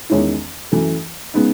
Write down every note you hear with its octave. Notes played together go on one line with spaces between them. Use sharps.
E2 D#3 G#3 C#4 E4
F#2 E3 A3
C#3 G#3 B3 D#4